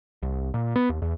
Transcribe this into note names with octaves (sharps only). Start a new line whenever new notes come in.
C2
A#2
B3
D#2
E2